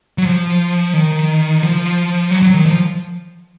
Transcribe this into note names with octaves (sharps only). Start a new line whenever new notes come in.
F#3
F3
D#3
F3
F#3
F#3
D#3
F3